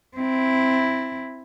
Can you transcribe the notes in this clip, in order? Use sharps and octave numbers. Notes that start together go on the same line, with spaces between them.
C4 E4